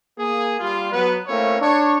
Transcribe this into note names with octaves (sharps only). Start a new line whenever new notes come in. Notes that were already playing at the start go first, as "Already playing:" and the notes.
A#3 G#4
G3 F4
F#3 B3 B4
A3 A#3 C4 C#4 E4 C#5
D4 C#5